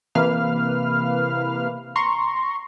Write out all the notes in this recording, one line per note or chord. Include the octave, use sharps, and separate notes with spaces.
C3 E3 A#3 B4 F5 F6
A#5 C6 C#6